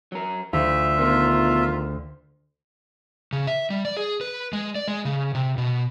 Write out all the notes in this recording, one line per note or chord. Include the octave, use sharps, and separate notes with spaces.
F#3 A#4
D2 F4 E5
B2 D#3 F3 F4
C#3
E5
G3
D5
G#4
B4
G#3
D5
G#3
C#3
C3
B2